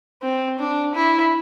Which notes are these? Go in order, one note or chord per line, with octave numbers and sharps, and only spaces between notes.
C4
D4
E4